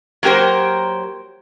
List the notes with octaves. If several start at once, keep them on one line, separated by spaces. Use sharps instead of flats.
F#3 A#3 G4 A#4 C5